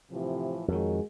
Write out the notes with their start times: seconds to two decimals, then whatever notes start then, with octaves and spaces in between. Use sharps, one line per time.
0.12 A2 C3 E3 F3
0.68 F2 D#3 G#3 F#4 A#4 C#5